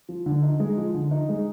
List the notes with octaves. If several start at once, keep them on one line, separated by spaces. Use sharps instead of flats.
F3
D3
D#4
G#3
F3
D3
D#4
G#3